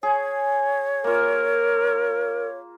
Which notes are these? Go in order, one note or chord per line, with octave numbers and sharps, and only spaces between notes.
G#4 C#5
A#3 F4 A#4